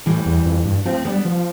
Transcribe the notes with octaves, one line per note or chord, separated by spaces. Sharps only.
A2 E3 G3
E2
F2
G2
F3 A3 C4
G3 B3 D4
F3